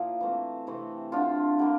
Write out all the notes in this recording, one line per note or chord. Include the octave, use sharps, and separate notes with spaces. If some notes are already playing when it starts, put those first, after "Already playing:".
Already playing: A#2 F3 A#3 E4
E3 A3 C4
C3 E3 A3 C4
D3 A3 C4 D4 F4
D3 G3 A#3